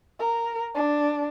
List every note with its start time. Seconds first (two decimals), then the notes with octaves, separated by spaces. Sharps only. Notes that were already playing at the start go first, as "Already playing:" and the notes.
0.19 A#4
0.75 D4